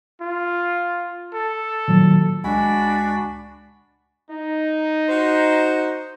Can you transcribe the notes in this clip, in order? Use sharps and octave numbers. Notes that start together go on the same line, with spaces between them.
F4
A4
A#2 D#3 F#3
C#2 G#3 D4 F#4 G#5 B5
D#4
F#4 C5